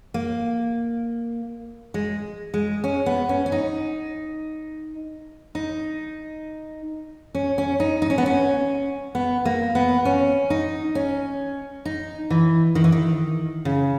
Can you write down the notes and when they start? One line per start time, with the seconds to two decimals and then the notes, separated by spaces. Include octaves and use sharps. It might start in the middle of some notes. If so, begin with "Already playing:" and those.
0.14 A#3
1.94 G#3
2.54 G#3
2.84 C#4
3.06 B3
3.29 C#4
3.46 C#4
3.52 D#4
5.55 D#4
7.35 C#4
7.58 C#4
7.80 D#4
8.02 D#4
8.10 C#4
8.18 B3
8.26 C#4
9.15 B3
9.45 A#3
9.75 B3
10.05 C#4
10.50 D#4
10.95 C#4
11.85 D#4
12.30 E3
12.75 D#3
12.84 E3
12.92 D#3
13.65 C#3